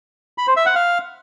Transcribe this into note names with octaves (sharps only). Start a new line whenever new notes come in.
B5
C5
E5
F#5
F5